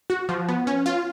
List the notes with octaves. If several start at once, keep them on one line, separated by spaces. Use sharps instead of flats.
F#4
F3
B3
C#4
F4